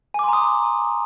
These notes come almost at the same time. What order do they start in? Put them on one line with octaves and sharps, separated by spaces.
G#5 D6 C6 A#5 D#6